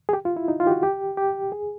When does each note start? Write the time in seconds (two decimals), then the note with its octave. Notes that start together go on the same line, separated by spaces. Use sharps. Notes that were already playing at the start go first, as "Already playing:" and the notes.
0.09 G#4
0.13 G4
0.25 F4
0.37 E4
0.48 D#4
0.60 F4
0.67 G4
0.71 F#4
0.83 G4
1.17 G4
1.52 G#4